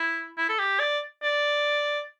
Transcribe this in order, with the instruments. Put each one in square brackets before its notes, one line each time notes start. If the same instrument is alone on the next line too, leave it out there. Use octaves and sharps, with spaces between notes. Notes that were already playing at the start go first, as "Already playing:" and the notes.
Already playing: [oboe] E4
E4
A4
G4
D5
D5